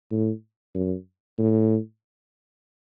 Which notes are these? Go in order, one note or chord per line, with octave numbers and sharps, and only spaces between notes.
A2
F#2
A2